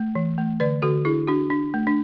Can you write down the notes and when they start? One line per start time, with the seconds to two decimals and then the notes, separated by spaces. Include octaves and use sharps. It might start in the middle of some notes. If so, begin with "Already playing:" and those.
Already playing: A3
0.15 E3
0.38 A3
0.60 D3 B4 D5
0.82 D3 F#4 A4
1.05 D4 E4 G#4
1.28 D4 F#4
1.50 D4
1.74 A3
1.87 D4